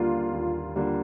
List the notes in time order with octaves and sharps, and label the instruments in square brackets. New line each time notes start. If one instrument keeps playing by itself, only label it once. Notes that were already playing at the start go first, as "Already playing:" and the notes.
Already playing: [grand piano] D#2 D3 G3 A#3 D4 [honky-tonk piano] F4
[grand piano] D#2
D3 G3 A#3 D4